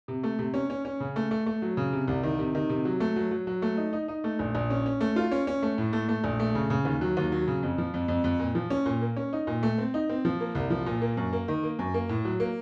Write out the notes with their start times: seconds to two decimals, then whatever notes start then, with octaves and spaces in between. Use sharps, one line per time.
0.08 C3
0.23 A3
0.39 C3
0.54 C#4
0.70 C#4
0.85 C#4
1.00 C#3
1.16 A3
1.31 A3
1.46 A3
1.62 F#3
1.77 C#3
1.93 C3
2.08 C2
2.23 D#3
2.39 C3
2.55 D#3
2.69 C3
2.85 F#3
3.00 A3
3.16 F#3
3.31 F#3
3.47 F#3
3.62 A3
3.77 D#4
3.93 D#4
4.08 D#4
4.24 A3
4.39 A#1
4.55 A#1
4.70 C#4
4.86 C#4
5.01 A3
5.16 F4
5.32 C#4
5.47 C#4
5.62 A3
5.78 A2
5.93 A3
6.08 A3
6.24 A#1
6.40 A3
6.55 C#3
6.70 C#3
6.85 D#2
7.01 F#3
7.17 D#2
7.32 F#3
7.47 C#3
7.63 F2
7.78 F3
7.94 F2
8.08 F2
8.24 F2
8.40 A#2
8.55 F3
8.70 C#4
8.86 A#2
9.01 A#3
9.16 C#4
9.33 D#4
9.47 A#2
9.63 A3
9.78 C4
9.94 D#4
10.09 C4
10.25 F3
10.40 A#3
10.55 C2
10.70 F3
10.86 A#2
11.02 A#3
11.17 F#2
11.33 A#3
11.48 D#3
11.63 A#3
11.79 F#2
11.94 A#3
12.09 A2
12.25 F#3
12.40 A#3